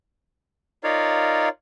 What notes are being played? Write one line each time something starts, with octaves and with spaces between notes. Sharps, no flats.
D#4 F4 A#4 C#5 D5 F5